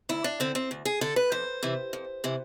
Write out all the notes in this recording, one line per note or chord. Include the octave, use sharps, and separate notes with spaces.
D2 E4
D4
D3 C4
C4
D2
G#4
D3 A4
B4
F2 C5
C3 E3
F2
C3 E3